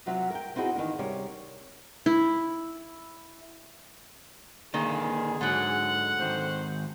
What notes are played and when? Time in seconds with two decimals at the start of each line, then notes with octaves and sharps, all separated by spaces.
0.06 C3 F#3 F4 E5 F#5
0.30 A#4 G5
0.56 C4 D#4 E4 F#4 G#4
0.75 D#3 E3 A#3 D4
0.99 C3 G3 A#4 C#5
2.06 E4
4.74 D3 D#3 A#3 G#4 D5
5.41 G#2 D3 F#3 F#5
6.19 G#2 D#3 C5